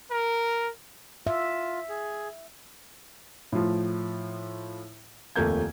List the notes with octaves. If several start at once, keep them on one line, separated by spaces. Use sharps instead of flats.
A#4
F4 E5
G#4
A2 F3
D#1 F2 A3 A#3 G6 G#6